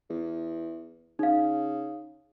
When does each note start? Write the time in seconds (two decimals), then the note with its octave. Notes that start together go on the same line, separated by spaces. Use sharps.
0.10 E2
1.19 C#3 D#4 F5